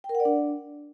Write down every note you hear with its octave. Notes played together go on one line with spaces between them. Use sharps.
G5
A#4
F#5
D5
D4